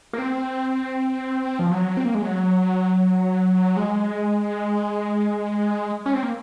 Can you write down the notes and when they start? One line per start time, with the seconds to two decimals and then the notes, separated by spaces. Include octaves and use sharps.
0.13 A#3
0.18 C4
1.59 F3
1.71 F#3
1.97 C4
2.05 A#3
2.15 G#3
2.22 F#3
3.77 G#3
6.06 C#4
6.14 C4
6.23 A#3